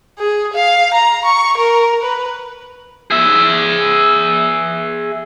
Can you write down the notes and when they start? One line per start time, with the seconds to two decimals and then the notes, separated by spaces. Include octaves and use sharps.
0.19 G#4
0.53 F5
0.94 A#5
1.25 C#6
1.57 A#4
2.02 B4
3.11 G#4 E5